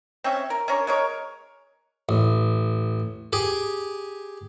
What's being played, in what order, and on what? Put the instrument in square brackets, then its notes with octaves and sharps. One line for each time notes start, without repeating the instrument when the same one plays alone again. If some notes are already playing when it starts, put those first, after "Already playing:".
[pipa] C4 C#4 E5
A#4
C#4 D4 A#4 C#5
G#3 A#4 C#5
[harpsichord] A1
G4 G#4